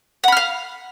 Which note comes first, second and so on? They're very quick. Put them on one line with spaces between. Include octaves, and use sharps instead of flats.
F#5 B5 F6 F5